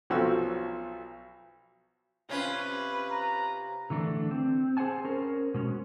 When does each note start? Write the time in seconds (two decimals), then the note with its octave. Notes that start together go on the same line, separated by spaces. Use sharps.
0.10 B1 F3 F#3 F#4 A4 E6
2.29 C3 C#4 F4 B4
3.11 A#5
3.90 D3 E3 A3 D4
4.31 C4
4.77 G#4 C5 D5 F#5 G#5 A5
5.05 C#4 A#4 C5
5.54 B2 G#3 C#4